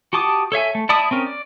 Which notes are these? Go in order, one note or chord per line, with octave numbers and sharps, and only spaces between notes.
F#4 G4 A5 D6 D#6
A4 C#5 E5 G#5
A3
E4 D5 E5 A5 D#6
C4 C#4 A#4
D5